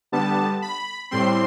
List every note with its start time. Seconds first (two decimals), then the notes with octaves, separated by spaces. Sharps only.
0.12 D3 G3 B3 A5
0.62 B5
1.11 A2 G3 C4 C6